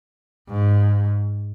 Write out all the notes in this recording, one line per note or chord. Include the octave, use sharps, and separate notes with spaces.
G#2